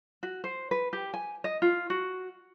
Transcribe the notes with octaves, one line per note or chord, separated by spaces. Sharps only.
F#4
C5
B4
G4
G#5
D#5
F4
F#4